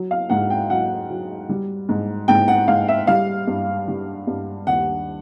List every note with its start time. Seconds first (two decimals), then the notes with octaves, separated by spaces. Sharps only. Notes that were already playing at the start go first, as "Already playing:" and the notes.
Already playing: F#3
0.11 F5
0.30 G#2 F#5
0.50 G5
0.70 F#3 F#5
1.10 F#3
1.49 G3
1.89 G#2
2.28 G#2 G5
2.48 F#5
2.68 G#2 F5
2.88 E5
3.07 G3 F5
3.47 G2
3.88 G3
4.27 G2
4.67 D#2 F#5